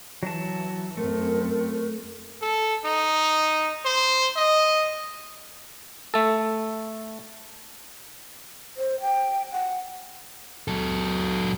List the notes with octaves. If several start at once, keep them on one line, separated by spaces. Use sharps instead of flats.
E3 F#3 A5
F#2 A3 C4 A#4
A4
D#4
C5
D#5
A3 A4
C5
G5
F#5
F#3 A4